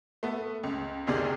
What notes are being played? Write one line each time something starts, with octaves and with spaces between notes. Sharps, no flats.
A3 B3
C#2
F#1 D2 C3 D#3 G#4 D5